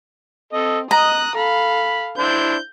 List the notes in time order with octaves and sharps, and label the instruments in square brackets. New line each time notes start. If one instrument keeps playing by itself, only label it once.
[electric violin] C4 [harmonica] A4 D#5
[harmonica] D#5 [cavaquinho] A#5 [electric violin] D#6 F#6
[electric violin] A4 F5 [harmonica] B5
[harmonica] D4 E4 C5 [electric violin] G6